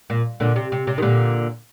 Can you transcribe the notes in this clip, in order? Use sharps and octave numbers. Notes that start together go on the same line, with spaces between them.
A#2
A#2 D3
C3
C3
C3
D#3
A#2 D3